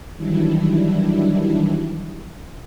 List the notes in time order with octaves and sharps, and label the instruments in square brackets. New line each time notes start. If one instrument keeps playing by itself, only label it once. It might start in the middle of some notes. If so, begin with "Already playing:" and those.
[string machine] D#3 E3 F#3 G3 D4 E4